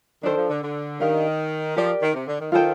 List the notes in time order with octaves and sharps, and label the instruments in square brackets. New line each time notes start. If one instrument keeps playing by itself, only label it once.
[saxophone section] D#3 [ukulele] D4 A4 C5
[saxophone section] F3
D3
D3
[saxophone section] D#3 [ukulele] D4 G4 A#4 F5
[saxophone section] F3 [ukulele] G4 A#4 D5
[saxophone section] D#3
C3
D3
D#3
[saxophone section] D#3 [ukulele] F4 A4 C5 G5